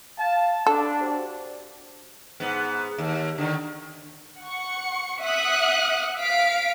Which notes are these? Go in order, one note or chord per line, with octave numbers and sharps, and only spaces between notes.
F5 A5
D4 A4 A5
F#4 G4 C5
G#2 B3
D#2
D3 D#3
F#5 C#6 C#7
E5 F#5 D#6 F#6 C#7
F5 B6 D7